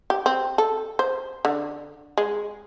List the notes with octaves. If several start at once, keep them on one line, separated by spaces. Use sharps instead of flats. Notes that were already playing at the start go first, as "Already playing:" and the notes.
G4
C4
A4
C5
D3
G#3